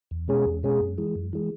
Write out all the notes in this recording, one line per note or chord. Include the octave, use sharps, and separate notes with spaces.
E2
B2 G#3 C#4 G#4
E2
B2 G#3 C#4 G#4
F#2
E3 G#3
F#2
E3 G#3